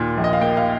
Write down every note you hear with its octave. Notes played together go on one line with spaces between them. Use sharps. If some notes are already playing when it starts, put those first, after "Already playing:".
Already playing: D#2 A#2
A#1
D#5
F5
A#3 G5
F5